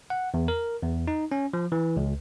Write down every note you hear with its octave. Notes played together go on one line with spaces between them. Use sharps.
F#5
E2
A#4
E2
D#4
C#4
F3
E3
C#2